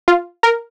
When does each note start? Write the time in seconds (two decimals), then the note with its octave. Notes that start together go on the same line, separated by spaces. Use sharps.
0.08 F4
0.43 A#4